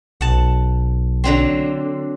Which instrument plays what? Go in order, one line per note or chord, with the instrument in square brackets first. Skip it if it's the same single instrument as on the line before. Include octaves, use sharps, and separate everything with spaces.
[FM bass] B1 [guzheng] F#5 A5
[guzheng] D3 F#3 C4